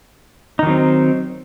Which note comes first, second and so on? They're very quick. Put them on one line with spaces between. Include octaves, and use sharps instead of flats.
D#4 D#3 F#3 C4